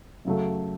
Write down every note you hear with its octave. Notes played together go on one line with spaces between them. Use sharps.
F#2 C#3 F#3 A3